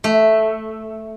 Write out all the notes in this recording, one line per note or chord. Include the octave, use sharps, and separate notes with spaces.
A3